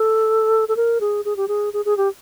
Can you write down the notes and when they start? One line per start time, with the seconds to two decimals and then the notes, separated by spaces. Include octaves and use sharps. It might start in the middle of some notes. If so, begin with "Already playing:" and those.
Already playing: A4
0.69 A4
0.77 A#4
1.01 G#4
1.25 G#4
1.37 G4
1.48 G#4
1.73 G#4
1.85 G#4
1.97 G4